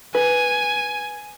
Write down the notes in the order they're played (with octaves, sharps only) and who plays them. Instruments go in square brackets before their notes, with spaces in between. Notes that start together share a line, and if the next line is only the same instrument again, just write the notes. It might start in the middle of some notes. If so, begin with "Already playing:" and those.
[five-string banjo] B4 [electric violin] G#5